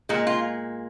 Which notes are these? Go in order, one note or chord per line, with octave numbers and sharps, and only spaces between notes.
A#2 G#3
F4